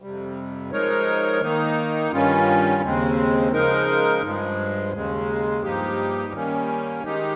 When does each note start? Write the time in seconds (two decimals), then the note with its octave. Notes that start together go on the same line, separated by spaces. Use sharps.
0.01 F2 C3 G3
0.71 F3 G#3 D#4 A#4 C#5
1.41 D#3 A#3 D#4
2.11 G2 D#3 G3 C#4 F4
2.82 D#2 C#3 G#3 C4
3.52 C#3 F3 G#3 D#4 A#4
4.22 G2 F3 G#3
4.93 D#2 C#3 G#3
5.63 G2 F3 A#3 D#4 G4
6.33 D#3 G3 A#3 C#4
7.04 D#3 G#3 D#4 G4